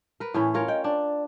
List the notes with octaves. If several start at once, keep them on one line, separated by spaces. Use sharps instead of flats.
A#4 B4
A2 E3 C#4 E4
F4 A#4 C#5
D#5 G5
D4 D5